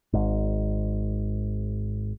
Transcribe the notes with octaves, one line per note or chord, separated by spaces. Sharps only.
G#1 G#2